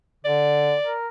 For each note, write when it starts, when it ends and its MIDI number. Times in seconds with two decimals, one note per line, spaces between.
0.25 0.75 50
0.25 0.93 74
0.85 1.08 70